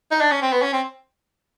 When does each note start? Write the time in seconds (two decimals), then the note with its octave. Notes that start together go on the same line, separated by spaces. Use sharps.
0.11 D#4
0.21 D4
0.31 C#4
0.42 C4
0.52 B3
0.62 C#4
0.73 C4